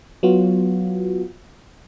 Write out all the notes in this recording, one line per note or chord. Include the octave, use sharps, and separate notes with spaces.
F#3 B3 F4 F#4